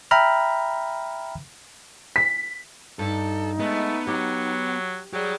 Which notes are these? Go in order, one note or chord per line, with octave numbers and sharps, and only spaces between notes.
E5 G5 A#5 B5 F6
B6
G2 D#4 A4
G#3 A3 B3
F#3 G4
F#3 G4 G#4 D5